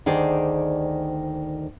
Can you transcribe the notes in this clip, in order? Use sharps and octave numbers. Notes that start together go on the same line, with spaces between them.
D2 D#3 G#4 C5 D5